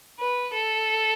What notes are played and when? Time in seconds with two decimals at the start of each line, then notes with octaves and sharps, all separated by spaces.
0.19 B4
0.53 A4